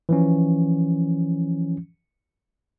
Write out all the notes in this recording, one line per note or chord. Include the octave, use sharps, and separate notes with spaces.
E3 F3 C#4